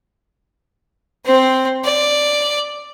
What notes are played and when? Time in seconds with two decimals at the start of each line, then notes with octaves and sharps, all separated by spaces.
1.26 C4 C5
1.85 D5